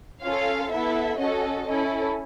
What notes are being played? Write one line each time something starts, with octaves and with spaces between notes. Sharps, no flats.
C#4 F4 A4 F5
B3 E4 A4 E5
C#4 F#4 A4 D#5
C#4 E4 A4